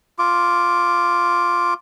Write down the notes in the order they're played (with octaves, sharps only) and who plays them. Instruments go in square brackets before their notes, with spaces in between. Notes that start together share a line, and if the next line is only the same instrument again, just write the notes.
[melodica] F4 D6